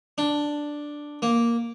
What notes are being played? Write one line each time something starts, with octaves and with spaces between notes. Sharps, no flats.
D4
A#3